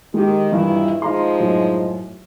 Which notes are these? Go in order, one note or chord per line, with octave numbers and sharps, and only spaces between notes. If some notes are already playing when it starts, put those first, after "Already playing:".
D#3 G#3 G4
G2 A#2 D#3 E3 E4
F3 G#3 D#4 F5 A#5 C6
F#2 A2